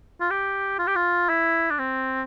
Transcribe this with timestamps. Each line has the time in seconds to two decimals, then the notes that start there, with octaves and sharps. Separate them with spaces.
0.20 F4
0.30 G4
0.79 F4
0.87 G4
0.96 F4
1.29 E4
1.70 D4
1.79 C4